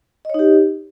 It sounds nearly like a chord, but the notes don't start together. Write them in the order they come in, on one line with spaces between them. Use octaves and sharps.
D#5 C#5 D#4 G4